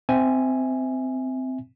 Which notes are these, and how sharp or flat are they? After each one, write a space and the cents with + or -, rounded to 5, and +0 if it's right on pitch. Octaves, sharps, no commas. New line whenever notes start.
C4 -15 E5 -15 G#5 +0